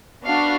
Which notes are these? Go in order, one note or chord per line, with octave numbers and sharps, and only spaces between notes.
B3 D4 F#4 F5